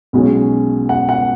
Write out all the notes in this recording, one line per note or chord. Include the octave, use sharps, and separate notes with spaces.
B1 B2 G#3 C#4
F#5
F#5